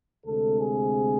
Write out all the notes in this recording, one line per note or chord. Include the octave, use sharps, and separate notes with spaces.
D2 C3 G#3 C4 A4
G#4